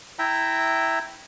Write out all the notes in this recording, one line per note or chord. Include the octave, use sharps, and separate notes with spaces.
E4 E5 G5 A#5